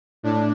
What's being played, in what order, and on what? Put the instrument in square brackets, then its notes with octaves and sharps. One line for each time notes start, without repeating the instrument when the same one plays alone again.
[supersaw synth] A2 D4